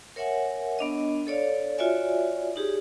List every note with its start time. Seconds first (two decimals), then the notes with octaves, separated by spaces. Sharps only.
0.16 A#4 C#5 E5 F#5 G#5
0.79 B3 D4 D#5
1.27 A4 C#5 D5 F5
1.78 F4 F#4 C#5 D5 E5 G#5
2.56 D#4 G4 G#4